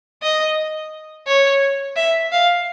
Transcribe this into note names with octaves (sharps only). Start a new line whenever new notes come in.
D#5
C#5
E5
F5